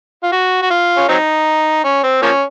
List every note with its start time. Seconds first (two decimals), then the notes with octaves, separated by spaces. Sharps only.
0.23 F4
0.32 F#4
0.62 F#4
0.70 F4
0.97 C#4
1.09 F#3 C4 D#4
1.84 C#4
2.03 C4
2.22 F3 A#3 C#4